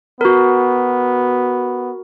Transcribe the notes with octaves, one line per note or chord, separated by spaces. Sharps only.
B3 F#4 A#4